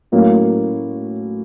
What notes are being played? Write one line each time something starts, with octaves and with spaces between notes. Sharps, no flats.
A2 F#3 A#3 C#4